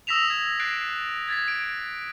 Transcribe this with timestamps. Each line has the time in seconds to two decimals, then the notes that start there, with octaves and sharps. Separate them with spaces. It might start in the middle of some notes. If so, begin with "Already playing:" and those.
0.07 D#6 E6 A#6 B6 E7 F7
0.30 G#6
0.60 F#6 A6 C7 D7
1.28 G#6 A6 B6
1.48 D7